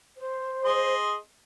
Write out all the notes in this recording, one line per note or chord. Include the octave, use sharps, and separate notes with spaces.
C5
G#4 D#5 C6